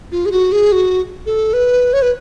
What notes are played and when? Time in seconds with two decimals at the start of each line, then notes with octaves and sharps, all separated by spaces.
0.12 F4
0.26 G#4
0.31 F#4
0.52 G#4
0.72 F#4
1.26 A4
1.53 B4
1.93 C#5
2.02 B4